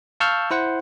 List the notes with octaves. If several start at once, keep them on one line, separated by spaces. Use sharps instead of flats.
F5 A5 C#6 E6 F6 G6
E4 C5 F#5